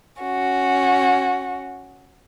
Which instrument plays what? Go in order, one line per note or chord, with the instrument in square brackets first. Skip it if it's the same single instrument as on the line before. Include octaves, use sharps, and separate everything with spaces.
[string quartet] C#4 F#4